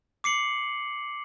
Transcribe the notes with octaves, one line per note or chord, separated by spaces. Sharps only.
D6 C7 C#7 F#7